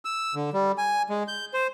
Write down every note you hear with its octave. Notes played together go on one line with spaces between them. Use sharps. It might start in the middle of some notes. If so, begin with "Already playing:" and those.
E6
D3
G3
G#5
G#3
G6
C5